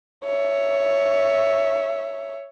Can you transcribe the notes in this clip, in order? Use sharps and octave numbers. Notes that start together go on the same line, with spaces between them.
C#5 E5